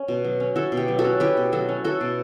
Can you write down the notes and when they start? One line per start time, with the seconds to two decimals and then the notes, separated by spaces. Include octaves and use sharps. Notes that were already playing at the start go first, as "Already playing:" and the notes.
Already playing: C#4
0.08 B2
0.24 F#3
0.40 C#4
0.56 E4 F#4 A4
0.72 B2
0.77 G4
0.88 F#3
0.99 F#4 A4
1.05 C#4
1.20 E4 G4 B4
1.37 B2
1.52 F#3 F#4 A4
1.69 C#4
1.84 E4 F#4 A4
2.01 B2